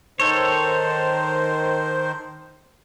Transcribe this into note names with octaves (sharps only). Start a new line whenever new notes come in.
D#3 A4 C5 C#5